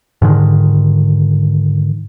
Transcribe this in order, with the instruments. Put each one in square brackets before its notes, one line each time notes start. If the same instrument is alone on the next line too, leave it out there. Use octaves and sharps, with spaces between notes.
[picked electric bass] G#2 D3 D#3